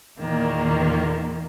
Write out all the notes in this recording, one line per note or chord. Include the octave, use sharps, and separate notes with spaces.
E2 A#2 D#3 E3 A#3